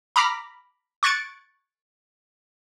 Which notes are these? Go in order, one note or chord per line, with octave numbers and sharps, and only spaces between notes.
A#5 B5 D6 F6 A#6 B6
C#6 F#6 G#6 A6 C#7 D7